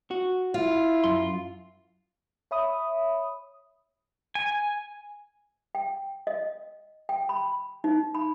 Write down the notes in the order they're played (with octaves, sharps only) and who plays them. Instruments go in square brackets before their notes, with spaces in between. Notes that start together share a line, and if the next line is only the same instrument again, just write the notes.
[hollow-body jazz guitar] F#4
[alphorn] E4 [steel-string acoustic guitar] F4
[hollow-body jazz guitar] F#2 C6
[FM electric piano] C#5 E5 B5 D#6
[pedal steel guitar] G#5
[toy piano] G5
D#5
G5
B5
D#4
B5